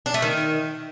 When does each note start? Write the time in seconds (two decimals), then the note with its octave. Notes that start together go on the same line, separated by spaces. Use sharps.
0.06 D4
0.14 A3
0.22 D#3